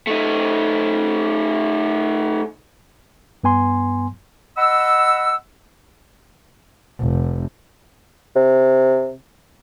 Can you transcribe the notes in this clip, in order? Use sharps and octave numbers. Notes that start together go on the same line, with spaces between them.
A3 D#4
G2 B3 G#5 C6
D#5 F#5 B5 E6
F1
C3